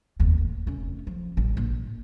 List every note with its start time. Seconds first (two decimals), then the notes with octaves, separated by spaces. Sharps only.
0.20 F1 D#2
0.38 A1
0.67 F1 C#4
1.07 F3
1.37 A1 G3
1.57 A#1